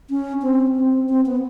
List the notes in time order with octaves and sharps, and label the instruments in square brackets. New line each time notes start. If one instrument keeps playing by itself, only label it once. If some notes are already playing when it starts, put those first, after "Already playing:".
[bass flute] C#4
C4
C4
C4
B3